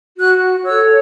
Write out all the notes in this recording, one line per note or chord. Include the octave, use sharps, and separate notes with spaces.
F#4 F#6
A4 C#5 E6